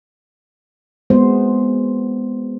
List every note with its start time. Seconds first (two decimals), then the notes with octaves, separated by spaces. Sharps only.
1.10 G#3 B3 C5